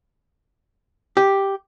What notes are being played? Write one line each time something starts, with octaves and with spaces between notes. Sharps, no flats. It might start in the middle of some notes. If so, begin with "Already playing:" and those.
G4